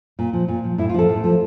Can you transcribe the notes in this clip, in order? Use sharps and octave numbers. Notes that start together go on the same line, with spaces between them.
A#2
F3
A#2
F3
A2 E4
F4
F3 A4
A2
F3